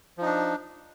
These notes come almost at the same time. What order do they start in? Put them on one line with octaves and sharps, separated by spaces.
F3 D#4 D4